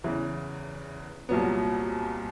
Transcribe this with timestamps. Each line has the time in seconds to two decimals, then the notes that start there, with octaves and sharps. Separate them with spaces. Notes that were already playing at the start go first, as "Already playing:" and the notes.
0.04 E2 C#3 E3
1.29 C2 A#2 F#3 B3